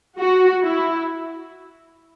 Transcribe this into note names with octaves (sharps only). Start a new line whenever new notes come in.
F#4
E4